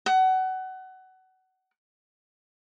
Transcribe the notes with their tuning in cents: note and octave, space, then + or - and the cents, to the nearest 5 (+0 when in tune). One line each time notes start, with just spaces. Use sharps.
F#5 +25